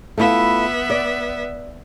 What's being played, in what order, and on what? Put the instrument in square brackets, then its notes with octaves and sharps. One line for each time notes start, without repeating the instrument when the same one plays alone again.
[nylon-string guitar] A3 E4 F4 [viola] B3 E5
[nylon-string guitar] D5